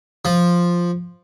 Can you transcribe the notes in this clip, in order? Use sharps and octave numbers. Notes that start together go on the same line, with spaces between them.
F3